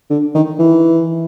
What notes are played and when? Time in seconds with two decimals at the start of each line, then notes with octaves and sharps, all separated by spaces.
0.10 D3
0.35 D#3
0.59 E3